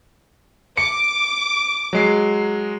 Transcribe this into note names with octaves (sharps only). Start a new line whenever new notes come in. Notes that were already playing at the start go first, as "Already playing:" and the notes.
D6 C#7
F#3 G#3 C7